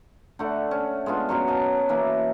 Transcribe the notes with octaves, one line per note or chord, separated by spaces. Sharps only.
D3 A3 F#5
C#4
G#3 B3 D4 F4
F#3 C#4 F#4
D#5 A5
E3 A#3 E4